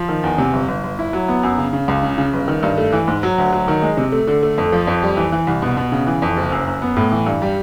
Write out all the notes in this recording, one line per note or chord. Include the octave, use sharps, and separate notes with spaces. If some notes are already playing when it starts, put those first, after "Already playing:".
Already playing: F3
D#3
E2
C3
G1
G1
G1
E4
F#3
B3
F#2
C#3
C#3
C#2
C#3
C#3
G1
D#3
G2
A3
E3
G#2
F#3
D2
F#3
D#3
G#3
C3
A3
D3
A3
F2
F3
F2
G3
E3
E3
C2
B2
B2
C#3
E3
F2
F#1
F#2
F#2
B3
A2
E3
G2
G3